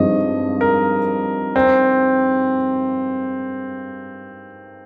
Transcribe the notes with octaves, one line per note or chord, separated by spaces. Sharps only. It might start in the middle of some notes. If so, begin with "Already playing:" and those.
Already playing: G2 F3 G#3 C4 D#4 D#5
A#4
C4